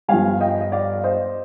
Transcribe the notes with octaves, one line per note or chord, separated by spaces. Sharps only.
G1 G2 F3 F5 G#5
D#5 G5
D#5
D5 F5
C5 D#5